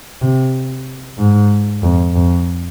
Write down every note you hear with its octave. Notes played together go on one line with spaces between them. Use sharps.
C3
G#2
F2
F2